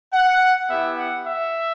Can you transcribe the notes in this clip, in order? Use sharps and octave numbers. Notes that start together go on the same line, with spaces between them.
F#5
B3 E4 G4 E5
F#5
E5